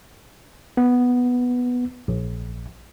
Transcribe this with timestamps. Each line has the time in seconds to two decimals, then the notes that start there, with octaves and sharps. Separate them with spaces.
0.77 B3
2.08 A#1